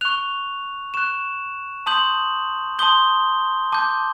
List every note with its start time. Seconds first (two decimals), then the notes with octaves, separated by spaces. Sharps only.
0.01 C#6 F#6 F7
0.94 C#6 F#6 E7
1.86 A5 C6 D#6 G6 F#7
2.79 A5 C6 D#6 G6 G7
3.72 A5 D6 G6